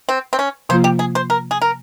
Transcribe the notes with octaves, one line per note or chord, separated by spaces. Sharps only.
C4
C4
C#4
C3 F3 A#3 F4 C5
G4
G#4
C5
A#4
G#4
A#4